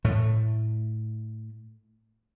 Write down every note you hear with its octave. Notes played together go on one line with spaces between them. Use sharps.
A2 A3